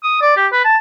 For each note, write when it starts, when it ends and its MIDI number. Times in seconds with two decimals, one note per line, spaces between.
0.03 0.20 87
0.22 0.32 74
0.37 0.47 67
0.52 0.65 71
0.65 0.77 81